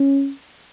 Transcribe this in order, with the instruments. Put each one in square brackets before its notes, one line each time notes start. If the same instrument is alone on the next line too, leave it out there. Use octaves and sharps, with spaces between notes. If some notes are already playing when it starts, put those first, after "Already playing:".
Already playing: [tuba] C#4